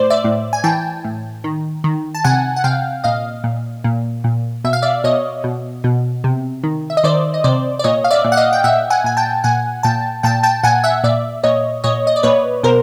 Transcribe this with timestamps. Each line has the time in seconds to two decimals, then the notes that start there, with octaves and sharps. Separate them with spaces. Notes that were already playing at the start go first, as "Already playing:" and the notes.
Already playing: A2 C5 D5
0.10 D5 E5
0.24 A2
0.53 G#5
0.64 E3 G5 A5
1.04 A2
1.44 D#3
1.84 D#3
2.15 A5
2.24 C3 F#5 G#5
2.56 F#5
2.64 C3 F5 G5
3.04 A#2 D#5 F5
3.44 A#2
3.84 A#2
4.24 A#2
4.64 B2 E5
4.73 F5
4.82 D5 E5
5.04 B2 C#5 D#5
5.44 B2
5.84 B2
6.24 C3
6.64 D#3
6.90 E5
6.97 D#5
7.04 D#3 C5 D5
7.34 D#5
7.44 C3 C5 D5
7.79 D5
7.84 A#2 C#5 D#5
8.04 F5
8.11 D5 E5
8.24 A#2
8.32 F#5
8.37 D#5 F5
8.53 G5
8.64 A#2 E5 F#5
8.90 F#5 G#5
9.04 A#2 G#5
9.17 G5 A5
9.44 A#2 F#5 G#5
9.83 A#2 G5 A5
10.23 A#2 G5 A5
10.43 G5 A5
10.63 A#2 F#5 G#5
10.84 E5 F#5
11.04 A#2 D5 E5
11.43 A#2 C#5 D#5
11.84 A#2 C#5 D#5
12.07 D#5
12.16 D5
12.23 A#2 B4 C#5
12.63 B2 A#4 C5